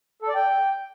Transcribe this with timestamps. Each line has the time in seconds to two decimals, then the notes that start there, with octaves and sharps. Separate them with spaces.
0.22 A4
0.28 D5
0.35 G5